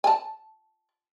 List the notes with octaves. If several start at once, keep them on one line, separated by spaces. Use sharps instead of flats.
G#5 A5